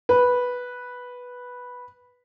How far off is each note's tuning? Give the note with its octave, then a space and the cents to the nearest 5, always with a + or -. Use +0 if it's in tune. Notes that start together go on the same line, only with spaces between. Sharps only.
B4 -5